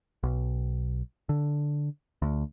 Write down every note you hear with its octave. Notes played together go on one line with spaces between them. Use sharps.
B1
D3
D2